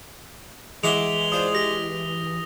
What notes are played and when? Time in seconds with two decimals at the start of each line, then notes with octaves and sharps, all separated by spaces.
0.83 E3 G#3 E5 F#5 D6 F7 G7
1.32 D4 F4 C5 D#6
1.55 G4 A#6